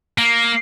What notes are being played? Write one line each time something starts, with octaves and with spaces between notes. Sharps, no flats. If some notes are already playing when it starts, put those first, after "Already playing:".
A#3